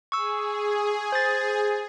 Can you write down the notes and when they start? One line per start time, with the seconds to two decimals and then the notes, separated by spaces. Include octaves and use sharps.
0.12 G#4 C#6 E6
1.12 C5 A6